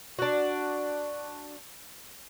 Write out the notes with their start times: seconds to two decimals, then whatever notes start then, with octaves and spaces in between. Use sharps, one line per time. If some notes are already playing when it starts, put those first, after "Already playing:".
0.19 D4 F#4